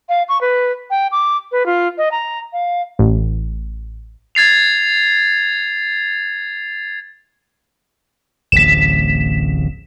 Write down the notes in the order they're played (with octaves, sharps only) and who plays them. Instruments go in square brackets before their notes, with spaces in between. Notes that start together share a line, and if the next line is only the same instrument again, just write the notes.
[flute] F5
C#6
B4
G5
D6
B4
F4
D#5
A#5
F5
[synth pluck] A1
[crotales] G#6 A6 C7 F7
[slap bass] D1 A1 [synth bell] B6 E7